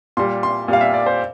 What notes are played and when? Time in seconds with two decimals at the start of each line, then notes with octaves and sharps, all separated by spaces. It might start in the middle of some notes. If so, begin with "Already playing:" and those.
0.17 A#2 G3 C6
0.43 C6
0.68 A#2 G3 F5
0.81 E5
0.94 D5
1.06 C5